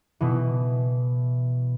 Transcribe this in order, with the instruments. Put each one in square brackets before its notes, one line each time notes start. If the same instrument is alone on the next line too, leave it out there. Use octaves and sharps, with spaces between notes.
[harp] B2 E3